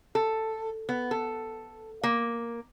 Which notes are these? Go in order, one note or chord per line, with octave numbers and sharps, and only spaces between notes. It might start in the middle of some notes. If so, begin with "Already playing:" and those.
A4
B3
A4
A#3